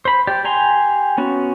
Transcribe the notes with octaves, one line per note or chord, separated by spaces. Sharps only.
C5 B5
G4 D5
G4 G#5 A#5 C6
B3 C#4 F#4